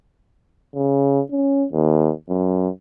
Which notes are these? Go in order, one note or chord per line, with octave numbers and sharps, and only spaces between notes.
C#3
C#4
D#2
F#2